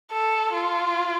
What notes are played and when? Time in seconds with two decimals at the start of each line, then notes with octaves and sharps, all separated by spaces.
0.12 A4
0.53 F4